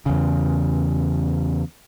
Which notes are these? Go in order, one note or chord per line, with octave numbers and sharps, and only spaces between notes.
E2 C#3